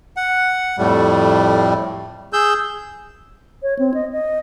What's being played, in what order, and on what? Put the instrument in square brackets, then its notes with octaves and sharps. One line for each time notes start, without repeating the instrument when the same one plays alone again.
[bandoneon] F#5
F2 A2 G3 A3
G#4 E6 G6
[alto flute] C#5
C4
D#5
D#5